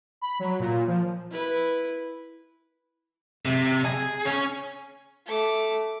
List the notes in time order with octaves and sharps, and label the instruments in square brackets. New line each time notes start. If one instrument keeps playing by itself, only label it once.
[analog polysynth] B5
F#3
A#2
F3
[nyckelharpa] E4 B4
[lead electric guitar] C3
G#4
C#4
[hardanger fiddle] A3 D6